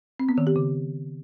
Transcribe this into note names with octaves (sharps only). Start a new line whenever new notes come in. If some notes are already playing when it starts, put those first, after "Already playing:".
C4
B3
D#3
G4
C#3